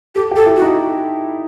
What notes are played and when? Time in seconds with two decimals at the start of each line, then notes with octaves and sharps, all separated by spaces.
0.15 G4 A4
0.31 G4 A4
0.46 E4
0.56 F#4
0.62 D#4